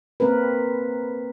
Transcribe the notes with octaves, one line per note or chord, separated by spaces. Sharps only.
A#3 C4 A#4 B4